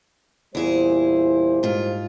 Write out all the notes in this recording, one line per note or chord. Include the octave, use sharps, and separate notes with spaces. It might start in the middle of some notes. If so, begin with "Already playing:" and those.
E2 A#2 G3 E4 G#4 C5
G#2 F4